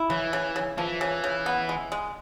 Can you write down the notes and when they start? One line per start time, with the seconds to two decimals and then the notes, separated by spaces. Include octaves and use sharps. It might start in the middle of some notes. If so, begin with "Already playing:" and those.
Already playing: E4
0.10 C#3 E3
0.33 C#3
0.56 C#3
0.78 E3 F3
1.01 C#3
1.24 C#3
1.46 B3
1.69 G#3
1.92 G#3